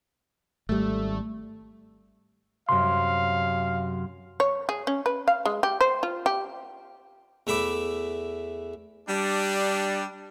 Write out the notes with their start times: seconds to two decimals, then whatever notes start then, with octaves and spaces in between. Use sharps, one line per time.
0.69 G#1 G3 A3
2.69 F#2 C3 F5 C6
4.40 C#5
4.69 G#4
4.87 C#4
5.06 B4
5.28 F5
5.45 G#3
5.63 G4
5.81 C5
6.03 F4
6.26 G4
7.47 E2 A3 E5 B5 D6
9.09 G3 D4